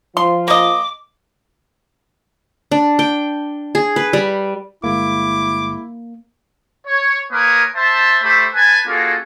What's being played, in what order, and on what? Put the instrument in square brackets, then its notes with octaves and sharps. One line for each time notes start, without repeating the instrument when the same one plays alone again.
[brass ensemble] F3 [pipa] C6
[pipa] A#3 D#5 [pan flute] D6
[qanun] D4
G5
G#4
B4
G3
[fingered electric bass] G1 G#3 [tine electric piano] A#3 [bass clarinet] E4 [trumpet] D6
[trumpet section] C#5
A#3 A#4 B4 C#5 G#5 D#6
C5 E5 A5
A3 G4 C5 E5 A5 B5
B4 G#5 A5
A#3 C#4 F4 F#4 G#4 A4